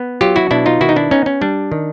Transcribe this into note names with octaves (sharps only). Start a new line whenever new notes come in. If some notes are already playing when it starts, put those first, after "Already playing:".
Already playing: B3
F#3 F4 G4
E4 F#4
B2 D4 E4
D#4 F4
D#3 E4 F#4
D#4
D4 E4
B3 C#4 D#4
C#4
G3 D4
D#3